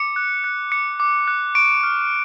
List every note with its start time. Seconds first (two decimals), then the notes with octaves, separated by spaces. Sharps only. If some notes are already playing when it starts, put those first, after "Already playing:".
Already playing: D6 C#7
0.16 F#6
0.44 F#6
0.72 D6 C#7
1.00 D6
1.28 F#6
1.55 C#6 D7
1.83 F6